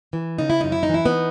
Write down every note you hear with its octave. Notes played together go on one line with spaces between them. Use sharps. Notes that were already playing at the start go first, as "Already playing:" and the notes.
E3
C#3 D#4
E4
F#2 D#4
E4
D#4
E3 E4
B3 D#4